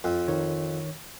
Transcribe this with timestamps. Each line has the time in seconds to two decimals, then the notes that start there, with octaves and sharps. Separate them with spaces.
0.04 F2
0.28 D#3 C#5